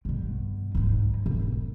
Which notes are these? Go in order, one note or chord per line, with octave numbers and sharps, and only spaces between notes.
G2 B2
G#2 D#4
E1